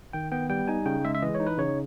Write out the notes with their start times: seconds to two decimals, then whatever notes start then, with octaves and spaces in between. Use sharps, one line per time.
0.13 D#3 G5
0.32 B3 G5
0.50 G3 G5
0.68 D#4 G#5
0.86 C#3 G5
1.05 G#3 E5
1.15 E5
1.22 E3 D#5
1.35 C#5
1.40 D#4
1.47 B4
1.58 C#3 C#5